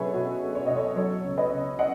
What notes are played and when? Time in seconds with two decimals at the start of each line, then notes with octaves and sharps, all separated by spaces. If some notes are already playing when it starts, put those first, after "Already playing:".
Already playing: B2 F#3 G#4 A4 B4 C#5 E5 G#5
0.13 B2 F#4 A4
0.42 A3
0.55 C#5
0.66 B2 D#5
0.76 A4 C#5
0.96 F#3 A4 C#5
1.24 C#2
1.37 B4 D#5
1.51 C#3
1.79 D#5 F#5